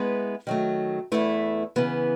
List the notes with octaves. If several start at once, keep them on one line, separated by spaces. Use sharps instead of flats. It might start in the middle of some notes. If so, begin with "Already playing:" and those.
Already playing: G#3 B3 E4 B4
D#3 F#3 A3
E2 B2 A3 E4 B4
C#3 E3 B3